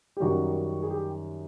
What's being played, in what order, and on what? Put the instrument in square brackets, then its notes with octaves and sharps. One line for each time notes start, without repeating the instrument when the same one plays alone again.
[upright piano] G4
F#2 D#3 G3 F#4
G#4
G4